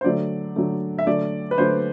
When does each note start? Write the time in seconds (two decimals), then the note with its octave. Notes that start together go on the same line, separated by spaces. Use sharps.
0.01 C5
0.04 D3 F#3 A3 D5
0.56 D3 F#3 A3
0.99 E5
1.07 D3 F#3 A3 D5
1.51 B4
1.58 D3 F#3 A3 C5